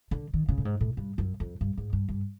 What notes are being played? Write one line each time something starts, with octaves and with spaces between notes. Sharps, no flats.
D3
D#3
C#3
A2
G#2
A2
G2
F#2
F2
G2
G#2
G2
G2